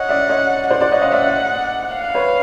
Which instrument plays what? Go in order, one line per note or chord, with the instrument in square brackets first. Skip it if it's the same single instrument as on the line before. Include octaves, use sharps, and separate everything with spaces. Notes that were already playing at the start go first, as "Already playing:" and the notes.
Already playing: [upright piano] C#5 D#5 [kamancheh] F#5
[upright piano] D5 E5
C#5 D#5
[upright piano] C5 D5 [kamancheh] F#5
[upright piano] C5 D5
C#5 D#5
D#5 F5
D5 E5
[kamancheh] F5
[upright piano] B4 C#5